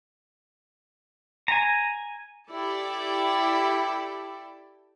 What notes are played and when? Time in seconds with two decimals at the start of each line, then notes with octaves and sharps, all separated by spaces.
1.48 G#5 A#5
2.51 E4 G4 A4 D5 G5